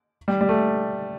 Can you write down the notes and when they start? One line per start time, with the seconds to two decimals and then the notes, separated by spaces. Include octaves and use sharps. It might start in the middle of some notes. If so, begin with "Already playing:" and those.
0.28 G3
0.41 G3
0.49 A3